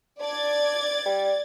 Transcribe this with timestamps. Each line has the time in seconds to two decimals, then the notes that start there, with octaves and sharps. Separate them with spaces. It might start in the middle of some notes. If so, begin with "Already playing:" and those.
0.21 D4 D5 G#6 A6
1.06 G3